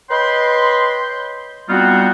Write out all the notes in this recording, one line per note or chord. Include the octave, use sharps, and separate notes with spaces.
B4 C#5 D#5 G5 B5 C6
G3 B3 C4 D#4 F4 F#4